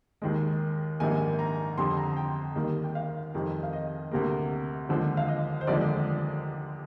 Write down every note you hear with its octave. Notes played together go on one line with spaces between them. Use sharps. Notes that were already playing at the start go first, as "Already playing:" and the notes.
D#2 D#3 G#3
A#1 G#2 D#3 G3 A#3 G#5
A#5
F2 D3 G3 C6
A#5
G5
D#2 D#3 G3 A#3
G5
F5
F1 F2 D#3 G3
F5
D#5
D2 C3 G3 A#3
D#2 D3 F3 G#3
F5
D#5
C5
F1 D#2 D3 F3 G#3 D5